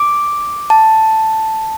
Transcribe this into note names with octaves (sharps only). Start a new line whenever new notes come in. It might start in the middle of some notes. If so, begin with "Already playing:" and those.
Already playing: D6
A5